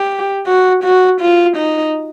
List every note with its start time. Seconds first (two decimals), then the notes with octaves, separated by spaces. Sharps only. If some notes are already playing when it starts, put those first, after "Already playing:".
Already playing: G4
0.47 F#4
0.84 F#4
1.21 F4
1.57 D#4